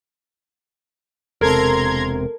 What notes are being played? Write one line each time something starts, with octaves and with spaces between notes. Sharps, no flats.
E1 C3 A4 A#4 A#5 C6 G#6